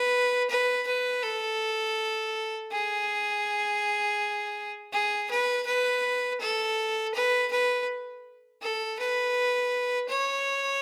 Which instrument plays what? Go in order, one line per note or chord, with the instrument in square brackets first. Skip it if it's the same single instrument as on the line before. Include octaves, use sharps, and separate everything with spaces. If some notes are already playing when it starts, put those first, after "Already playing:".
Already playing: [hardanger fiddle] B4
B4
B4
A4
G#4
G#4
B4
B4
A4
B4
B4
A4
B4
C#5